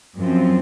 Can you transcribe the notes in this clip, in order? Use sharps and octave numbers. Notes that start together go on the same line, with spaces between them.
F#2 F3 C4